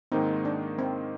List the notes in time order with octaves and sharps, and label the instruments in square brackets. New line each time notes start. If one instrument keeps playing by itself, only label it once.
[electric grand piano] G#2 D#3 A#3 D#4 [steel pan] C4
[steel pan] D4
C4